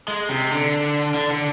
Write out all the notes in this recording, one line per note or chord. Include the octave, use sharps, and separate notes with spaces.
G#3
C3
D3
D3
D3